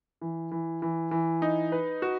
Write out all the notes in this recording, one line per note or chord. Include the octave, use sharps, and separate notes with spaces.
E3
E3
E3
E3
D#4
B4
F#4